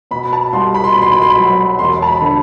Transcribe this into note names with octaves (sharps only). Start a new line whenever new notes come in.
B2 B5
A5
C2 C6
B5
C6
B2 B5
C6
B5
C6
B5
F#3
E1 C6
A5
B5
D3